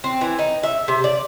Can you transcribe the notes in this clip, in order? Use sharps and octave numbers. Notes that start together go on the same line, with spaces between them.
C4
E3
D#4
E5
C3
D5